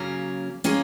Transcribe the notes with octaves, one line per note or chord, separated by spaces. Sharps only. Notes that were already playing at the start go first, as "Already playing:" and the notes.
Already playing: C#3 F#3 A#3 C#4
A#3 C#4 F4 G#4 C#5